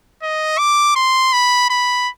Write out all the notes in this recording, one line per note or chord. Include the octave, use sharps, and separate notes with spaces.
D#5
D6
C6
B5
B5